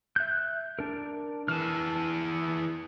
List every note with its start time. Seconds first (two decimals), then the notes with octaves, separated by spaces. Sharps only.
0.16 E5 F#6 G6
0.79 D4 A#4
1.48 E3 G#4 A5 F6